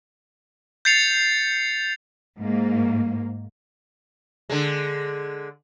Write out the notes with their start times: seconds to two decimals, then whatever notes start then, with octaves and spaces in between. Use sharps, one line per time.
0.85 G6 A6 C7 C#7 F7
2.38 G#2 A#3
4.50 D3 G#3